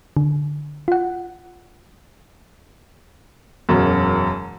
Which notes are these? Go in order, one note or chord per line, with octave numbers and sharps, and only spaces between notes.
D3
F4 F#5
E1 F#2